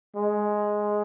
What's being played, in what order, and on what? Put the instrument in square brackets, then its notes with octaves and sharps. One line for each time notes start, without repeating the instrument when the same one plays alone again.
[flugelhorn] G#3